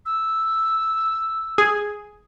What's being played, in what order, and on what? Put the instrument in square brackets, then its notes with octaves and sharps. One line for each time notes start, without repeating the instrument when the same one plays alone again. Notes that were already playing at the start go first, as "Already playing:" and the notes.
[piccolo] E6
[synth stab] G#4